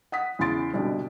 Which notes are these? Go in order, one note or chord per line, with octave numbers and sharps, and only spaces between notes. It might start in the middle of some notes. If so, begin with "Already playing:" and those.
F#5 D#6 B6
E2 C#3 E4 C6 A6 D7
C2 G#2 B2 D3